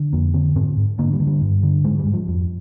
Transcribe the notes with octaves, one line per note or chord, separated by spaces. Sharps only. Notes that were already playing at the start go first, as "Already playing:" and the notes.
Already playing: D3
F2 A#3
D3 C4
G#2 C4
G#2
D3 A#3
G3
D3
G3
G2
D3
G#2 G#3
G3
G#2
F3
F2